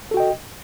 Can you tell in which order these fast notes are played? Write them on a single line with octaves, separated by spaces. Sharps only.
A4 F#4 G5 D#5